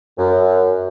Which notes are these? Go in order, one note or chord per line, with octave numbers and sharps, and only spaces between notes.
F#2